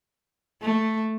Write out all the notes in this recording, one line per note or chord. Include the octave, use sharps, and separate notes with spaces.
A3